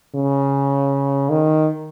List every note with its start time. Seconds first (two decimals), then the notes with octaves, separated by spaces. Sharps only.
0.15 C#3
1.30 D#3